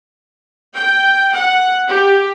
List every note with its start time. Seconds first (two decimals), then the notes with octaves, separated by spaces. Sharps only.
0.73 G5
1.33 F#5
1.88 G4